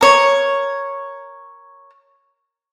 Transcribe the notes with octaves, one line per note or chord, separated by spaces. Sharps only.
A#4 C#5